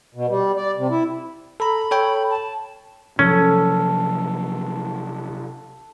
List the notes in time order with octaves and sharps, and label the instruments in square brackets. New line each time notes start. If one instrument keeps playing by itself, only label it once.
[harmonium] B2
G3
D5
C3
E4
[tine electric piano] A4 A#5 [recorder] B5
[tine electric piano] A4 C#5 G5
[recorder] A5
[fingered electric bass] C3 F3 F#3 [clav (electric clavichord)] C#4 [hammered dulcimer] A4